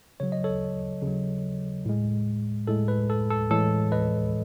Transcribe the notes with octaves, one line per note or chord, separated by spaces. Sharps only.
C#3 F#3 C#5
D#5
A4 C#5
C#3 F#3
A2 G#3
A2 G#3 A4
B4
A4
A4
A2 E3 G#3 A4 C#5
B4 D#5